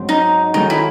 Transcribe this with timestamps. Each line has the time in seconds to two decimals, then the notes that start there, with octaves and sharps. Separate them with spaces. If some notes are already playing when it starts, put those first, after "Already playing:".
Already playing: G#2 F#3 C4
0.09 D#4
0.54 D#3 G#3 C#4 D#4 F#4 A4
0.70 E4